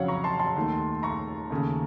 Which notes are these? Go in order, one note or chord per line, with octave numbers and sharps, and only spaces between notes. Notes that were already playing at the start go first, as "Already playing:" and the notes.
Already playing: F2 C#3 F#3 C#5 F5 F#5
A#5 C#6
A5 C6
A5 C6
D#2 D#3 A3
A#5 C#6
D#2 C#3 A3